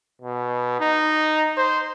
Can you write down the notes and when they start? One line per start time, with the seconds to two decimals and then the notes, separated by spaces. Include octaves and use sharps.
0.22 B2
0.80 D#4
1.57 C5